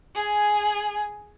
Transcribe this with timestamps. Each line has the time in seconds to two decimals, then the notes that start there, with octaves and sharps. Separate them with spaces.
0.15 G#4 G#5